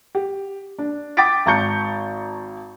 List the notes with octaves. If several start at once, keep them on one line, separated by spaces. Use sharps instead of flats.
G4
D4
G5 D6 D#6 A6 B6 D7
G#1 A5 A#5 C#6 G6 C#7